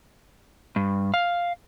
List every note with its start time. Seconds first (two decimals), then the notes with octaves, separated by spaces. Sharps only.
0.76 G2
1.14 F5